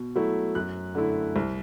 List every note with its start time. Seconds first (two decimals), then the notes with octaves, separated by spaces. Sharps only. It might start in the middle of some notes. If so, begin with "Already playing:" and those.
Already playing: B2
0.16 F#3 A3 E4
0.55 F#2 F#6
0.95 D3 A3 E4
1.36 C2